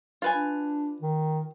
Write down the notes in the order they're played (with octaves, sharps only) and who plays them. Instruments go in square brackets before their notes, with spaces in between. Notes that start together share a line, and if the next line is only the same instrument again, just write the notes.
[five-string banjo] F4 B4 G#5
[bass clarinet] D4
D#3